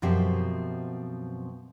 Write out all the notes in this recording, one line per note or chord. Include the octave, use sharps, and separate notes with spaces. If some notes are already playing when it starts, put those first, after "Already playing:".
F#2 B2 F3 C4 G4 E5